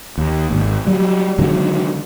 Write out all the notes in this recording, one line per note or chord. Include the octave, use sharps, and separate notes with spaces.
D#2
G#1
F#3 G3
D3 D#3 F#3 G#3